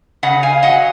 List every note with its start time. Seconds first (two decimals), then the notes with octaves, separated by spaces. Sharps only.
0.23 C#3 D#5 F#5
0.43 F5 G#5
0.62 F#3 D#5 F#5